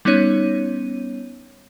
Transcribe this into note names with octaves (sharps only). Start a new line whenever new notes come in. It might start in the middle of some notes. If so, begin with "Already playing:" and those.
G3 B3 C#4 D#4 C#5 D#7